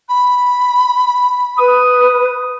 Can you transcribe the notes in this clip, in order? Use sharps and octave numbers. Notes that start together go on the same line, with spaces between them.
B5
B4 D#6